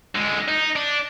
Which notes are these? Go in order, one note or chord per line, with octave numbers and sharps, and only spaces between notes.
D3 G#3
D#4
D4